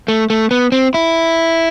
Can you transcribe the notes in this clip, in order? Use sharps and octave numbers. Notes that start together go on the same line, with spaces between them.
A3
A3
B3
C4
E4